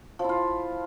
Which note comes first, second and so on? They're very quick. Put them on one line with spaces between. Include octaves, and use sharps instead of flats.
F3 E4 F4